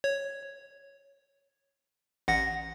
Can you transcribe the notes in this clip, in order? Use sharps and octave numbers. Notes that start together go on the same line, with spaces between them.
C#5
A1 F#5 A#6